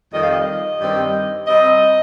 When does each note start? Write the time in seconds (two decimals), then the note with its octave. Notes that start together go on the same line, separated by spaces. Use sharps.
0.13 F2 D#3 G3 D#5
0.21 F5
0.30 D#5
0.80 G2 D#3 G3 C4
1.48 C3 G3 C4 D#5